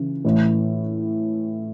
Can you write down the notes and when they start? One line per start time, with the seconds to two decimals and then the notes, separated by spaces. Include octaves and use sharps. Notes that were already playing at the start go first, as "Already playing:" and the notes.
Already playing: C#3 E3
0.25 A2 E3